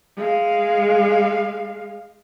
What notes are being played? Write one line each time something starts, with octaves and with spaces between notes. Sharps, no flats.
G#3 F5